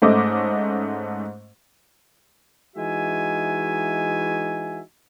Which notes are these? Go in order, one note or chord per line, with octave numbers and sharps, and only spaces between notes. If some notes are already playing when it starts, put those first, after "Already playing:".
G#2 A3 C#4 C5 D#5 D6
E3 G#3 D#4 F#4 E5 G#5